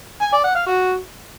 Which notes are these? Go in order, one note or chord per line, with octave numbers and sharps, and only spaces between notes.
G#5
D5
F#5
F5
F#4